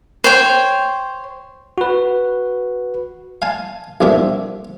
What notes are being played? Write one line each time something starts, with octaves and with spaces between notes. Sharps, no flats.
C5 C#5 G5
F#4 B4
F5 G#5 A5
B1 G2 A#2 C4 E5